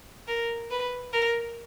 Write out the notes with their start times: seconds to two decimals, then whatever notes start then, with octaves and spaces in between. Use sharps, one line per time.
0.28 A#4
0.70 B4
1.12 A#4